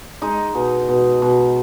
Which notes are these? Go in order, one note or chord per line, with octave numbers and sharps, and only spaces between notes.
G#3 D#4
B2
B2
B2